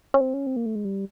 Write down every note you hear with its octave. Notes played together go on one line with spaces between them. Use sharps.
C#4
C4
C#4
C4
A#3
A3
G#3
G3